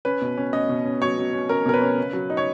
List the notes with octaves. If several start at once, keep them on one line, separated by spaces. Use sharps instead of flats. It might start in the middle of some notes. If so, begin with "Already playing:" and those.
C#4 B4
B2
C#4
C#4 D#5
B2
C#4
F#3 C#5
F#3
C#4
C#4 A#4
B2 A#4
B4
C#4
C#3
F#3
D#4
C#5